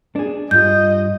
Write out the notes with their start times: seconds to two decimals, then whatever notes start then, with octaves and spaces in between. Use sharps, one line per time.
0.16 D4 G#4
0.51 G2 F4 D#5 G6